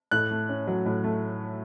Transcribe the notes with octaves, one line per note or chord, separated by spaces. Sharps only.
A2 F#6
A3
C#4
F#3
A2
A3